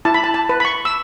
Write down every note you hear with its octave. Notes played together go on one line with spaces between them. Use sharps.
E4 A5
B5
A5
A5
B4
B5
C#6
E6